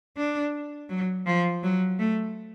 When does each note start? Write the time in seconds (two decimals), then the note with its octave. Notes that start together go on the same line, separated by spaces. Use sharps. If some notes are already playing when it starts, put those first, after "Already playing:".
0.17 D4
0.89 F#3
1.26 F3
1.63 F#3
1.99 A3